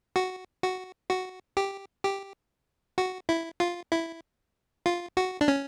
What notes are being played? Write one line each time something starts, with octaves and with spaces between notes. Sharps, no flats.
F#4
F#4
F#4
G4
G4
F#4
E4
F4
E4
F4
F#4
D4
C#4